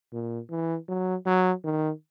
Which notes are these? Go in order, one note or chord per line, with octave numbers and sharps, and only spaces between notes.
A#2
E3
F#3
F#3
D#3